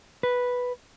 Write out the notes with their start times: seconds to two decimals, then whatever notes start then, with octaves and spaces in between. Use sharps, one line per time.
0.23 B4